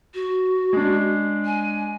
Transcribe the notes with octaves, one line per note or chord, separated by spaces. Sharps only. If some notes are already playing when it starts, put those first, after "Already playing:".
F#4
G#3 D4
G#5